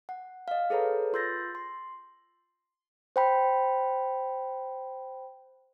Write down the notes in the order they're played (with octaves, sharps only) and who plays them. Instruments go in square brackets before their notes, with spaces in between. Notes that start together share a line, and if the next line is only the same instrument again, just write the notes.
[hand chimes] F#5
D#5 F5
G#4 A4 B4 C#5 A#5
F4 C6 E6 G6 A6 A#6
C6
C5 G5 B5